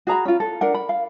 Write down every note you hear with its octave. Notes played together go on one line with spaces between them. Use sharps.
F#4 G#4 A#5 B5
C#4 F4
A4
D4 A#4 F#5
B5
F5